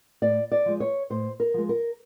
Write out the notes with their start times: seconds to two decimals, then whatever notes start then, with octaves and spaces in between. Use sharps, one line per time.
0.22 A2 D5
0.52 D5
0.66 F3 G#3
0.80 C#5
1.10 A2 C5
1.40 A#4
1.54 F3 G#3
1.69 A#4